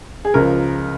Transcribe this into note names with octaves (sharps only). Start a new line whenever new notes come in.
G#4
C#2 C#3 F3 A#4